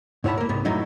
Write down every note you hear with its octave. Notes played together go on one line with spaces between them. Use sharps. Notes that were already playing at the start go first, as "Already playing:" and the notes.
G#2 E4 C#5 F#5 A5 B5
A#3 A#4
C2 G#2 B3
F#2 A2 D3 F#3 D#4 E4